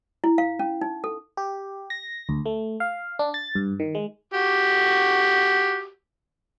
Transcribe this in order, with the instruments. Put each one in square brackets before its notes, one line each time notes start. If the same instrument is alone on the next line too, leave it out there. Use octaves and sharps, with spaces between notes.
[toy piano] E4
F5
C#4
D#4
A4
[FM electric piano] G4
A#6
D2
A3
F5
D4
A6
G2
D#3
G#3
[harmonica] F#4 G4